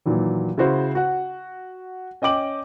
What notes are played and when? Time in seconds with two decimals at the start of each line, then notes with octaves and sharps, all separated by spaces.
0.06 A#2 D#3 E3 F#3
0.58 C#3 E4 F#4 C5
0.95 F#4 F#5
2.22 C#4 D#5 G5 D6 F#7